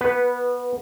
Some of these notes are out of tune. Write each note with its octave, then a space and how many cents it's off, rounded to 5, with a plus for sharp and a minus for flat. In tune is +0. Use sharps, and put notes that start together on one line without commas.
B3 -15 B4 +0